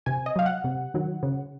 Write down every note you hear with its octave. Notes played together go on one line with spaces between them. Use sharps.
C3 G#5
D#5
F#3 F5
F#5
C3
D#3 F#3
C#3